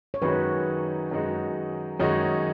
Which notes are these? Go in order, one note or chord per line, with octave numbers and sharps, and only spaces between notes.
C#5
F#2 D#3 G#3 D#4 F#4 B4
F#2 D#3 G#3 D#4 F#4
F#2 D#3 G#3 D#4 F#4 C#5